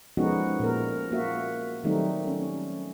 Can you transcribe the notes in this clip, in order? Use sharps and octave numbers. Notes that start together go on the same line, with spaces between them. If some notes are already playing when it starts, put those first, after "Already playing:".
F3 G#3 B3 C#4 D#4 F#4
A#2 A#4
A#3 F#4 E5
D#3 F#3 G3 A3 C4 D#4
C#4